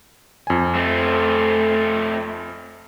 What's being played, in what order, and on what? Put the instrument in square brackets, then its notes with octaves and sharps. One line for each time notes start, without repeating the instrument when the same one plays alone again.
[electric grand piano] F2 G#5
[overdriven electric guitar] A3 C4